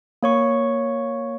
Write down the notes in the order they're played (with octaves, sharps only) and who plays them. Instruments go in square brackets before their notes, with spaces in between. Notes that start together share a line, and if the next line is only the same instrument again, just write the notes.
[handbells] A#3 C#5 C#6